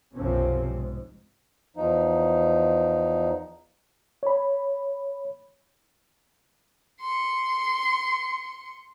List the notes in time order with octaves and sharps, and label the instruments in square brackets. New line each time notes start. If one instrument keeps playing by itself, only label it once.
[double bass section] B1 F#2 C3 F3 C4 C#4
G#2
[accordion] E2 F3 D#4
[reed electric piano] C#5 B5
[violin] C6 C#7